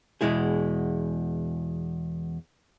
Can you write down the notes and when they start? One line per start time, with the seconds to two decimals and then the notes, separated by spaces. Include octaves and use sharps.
0.21 E2 B2 G#3 E4 G#4